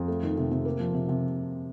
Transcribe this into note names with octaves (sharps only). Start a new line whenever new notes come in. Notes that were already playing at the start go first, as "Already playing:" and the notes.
Already playing: F2
A3
D#3
C3
C3
A#3
F3
C3
C3